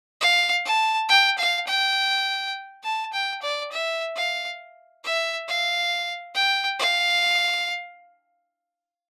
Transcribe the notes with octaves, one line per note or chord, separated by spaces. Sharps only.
F5
A5
G5
F5
G5
A5
G5
D5
E5
F5
E5
F5
G5
F5